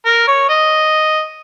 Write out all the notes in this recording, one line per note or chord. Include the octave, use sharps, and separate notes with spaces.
A#4
C#5
D#5